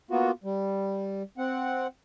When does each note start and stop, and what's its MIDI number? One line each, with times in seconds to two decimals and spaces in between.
0.11 0.31 58
0.11 0.31 59
0.11 0.31 65
0.11 0.31 66
0.44 1.23 55
1.38 1.87 60
1.38 1.87 78